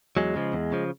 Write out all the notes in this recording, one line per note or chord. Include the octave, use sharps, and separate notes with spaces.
E2 F#3 G#3
C#3 F3
E2
C#3 F3